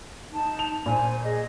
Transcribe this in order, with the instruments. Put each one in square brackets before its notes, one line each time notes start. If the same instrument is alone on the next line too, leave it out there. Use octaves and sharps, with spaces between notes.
[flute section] D#4 A5
[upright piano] F7
[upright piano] A#2 [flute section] C5 G#5
[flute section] G#4 D#5